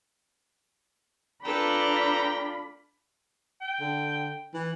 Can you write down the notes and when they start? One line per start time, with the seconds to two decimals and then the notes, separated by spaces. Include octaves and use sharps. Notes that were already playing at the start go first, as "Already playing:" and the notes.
1.45 D4 F4 A4 B4 G5 A#5 B5
3.61 G5
3.80 D3
4.54 E3